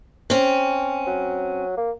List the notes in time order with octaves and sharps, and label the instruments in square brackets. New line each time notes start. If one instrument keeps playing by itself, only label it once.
[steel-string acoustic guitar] C4 C#4
[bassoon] F#3
A#3